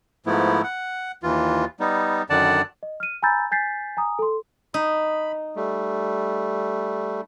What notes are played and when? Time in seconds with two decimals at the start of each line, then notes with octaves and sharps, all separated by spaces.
0.26 G#2 F3 A3 B3 E4
0.63 F#5
1.23 D#2 E3 F4
1.80 G3 B3 D#4
2.30 F#2 D3 D#3 D5 F#5 A5
2.83 D#5
3.00 F6 D#7
3.23 G#5 A#5 B5 E6 G6 A6
3.51 G#5 G6 A6 B6 C7
3.97 G#5 A#5 D#6
4.19 A4 C6
4.74 D#4 B5
5.56 G3 A3